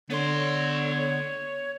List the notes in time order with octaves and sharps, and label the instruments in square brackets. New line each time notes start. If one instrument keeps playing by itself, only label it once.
[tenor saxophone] D3 [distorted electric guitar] B3 C6 [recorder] C#5